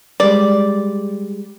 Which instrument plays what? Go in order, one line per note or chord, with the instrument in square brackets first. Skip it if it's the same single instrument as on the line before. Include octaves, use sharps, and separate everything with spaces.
[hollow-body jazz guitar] G3 G#3 [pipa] D5